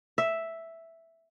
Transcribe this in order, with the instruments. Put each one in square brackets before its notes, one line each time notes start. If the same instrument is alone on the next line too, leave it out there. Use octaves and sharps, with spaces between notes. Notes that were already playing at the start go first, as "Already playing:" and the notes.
[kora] E5